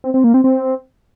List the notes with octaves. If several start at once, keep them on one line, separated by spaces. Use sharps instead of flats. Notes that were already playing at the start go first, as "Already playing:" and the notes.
C4
C4
A#3
C4
C4